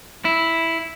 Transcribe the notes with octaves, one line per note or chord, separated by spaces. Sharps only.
E4